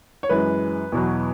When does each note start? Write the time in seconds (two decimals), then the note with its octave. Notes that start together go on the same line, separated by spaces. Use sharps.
0.23 C#5
0.30 F#2 E3 G#3 B4
0.92 E2 B2 F#3